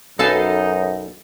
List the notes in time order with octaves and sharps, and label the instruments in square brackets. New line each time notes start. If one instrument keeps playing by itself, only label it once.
[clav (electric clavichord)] B1 B4 [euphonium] F#2 [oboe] D#4 [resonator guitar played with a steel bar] A4 F5 G#5